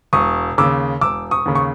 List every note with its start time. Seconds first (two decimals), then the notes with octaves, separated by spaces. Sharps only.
0.13 E1 C#6 D#6
0.58 D#2 C#3 D6 E6
1.01 E1 D6 E6
1.31 C#6 D#6
1.46 D#2 C#3
1.55 C#6